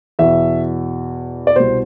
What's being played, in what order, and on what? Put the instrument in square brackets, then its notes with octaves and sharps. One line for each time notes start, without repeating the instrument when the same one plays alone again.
[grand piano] E2 B2 E5
D5
C2 B2 C5